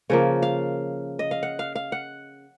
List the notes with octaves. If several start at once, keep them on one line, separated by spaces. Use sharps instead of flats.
C#3 F3 A#3 C#5
F5
D#5
F5
F#5
F5
F5
F#5